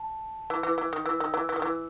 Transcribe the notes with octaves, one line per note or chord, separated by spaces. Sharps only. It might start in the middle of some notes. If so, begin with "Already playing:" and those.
Already playing: A5
E3
E3
E3
D#3
E3 E6
D#3
E3
E3
D#3
E3